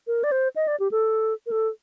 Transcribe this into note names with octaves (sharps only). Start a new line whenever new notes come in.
A#4
D5
C5
D#5
D5
G4
A4
A#4
A4